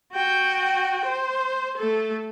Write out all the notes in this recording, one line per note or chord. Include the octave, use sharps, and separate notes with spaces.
F#4 G5
C5
A3 A4